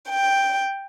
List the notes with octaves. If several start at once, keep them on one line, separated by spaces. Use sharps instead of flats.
G5